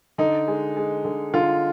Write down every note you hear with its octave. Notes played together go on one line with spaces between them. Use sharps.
D3 D#4
G#3
G#3
D3
D3 F4